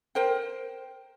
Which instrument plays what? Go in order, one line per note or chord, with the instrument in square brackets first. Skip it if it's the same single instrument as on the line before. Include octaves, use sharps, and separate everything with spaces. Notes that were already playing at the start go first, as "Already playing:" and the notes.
[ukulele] A#4 C5 G5